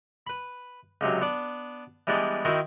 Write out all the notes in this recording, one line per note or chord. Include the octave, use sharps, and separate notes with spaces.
B4 B5
C#2 C3 F#3
B3 D4 D5
E3 G3 G#3 B3 D4
D#3 C4 E4 F#4